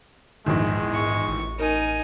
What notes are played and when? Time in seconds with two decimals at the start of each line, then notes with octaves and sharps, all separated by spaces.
0.46 A#1 E2 G#2 D#3 G#3
0.94 G#2 C#6
1.29 A1
1.59 D#4 A#4 G#5